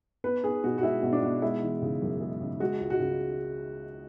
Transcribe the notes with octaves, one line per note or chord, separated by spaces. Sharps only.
B3 B4
B3 G#4
B2 F#4
F#4
G#3 E4
B2
D4
B2
G#3 E4
E3
C#3
F#2
G#3
C#3
G#3 F#4
C#2
F#4
C#3